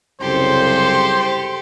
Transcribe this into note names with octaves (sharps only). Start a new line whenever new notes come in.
C2 F#2 C#3 G4 A4 C5 C6